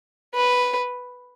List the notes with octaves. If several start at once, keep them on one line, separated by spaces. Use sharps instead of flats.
B4